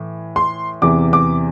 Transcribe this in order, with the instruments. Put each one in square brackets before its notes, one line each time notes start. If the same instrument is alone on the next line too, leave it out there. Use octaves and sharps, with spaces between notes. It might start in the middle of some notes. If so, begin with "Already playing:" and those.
Already playing: [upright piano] A2 E3
C6
E2 C3 E3 D6
D6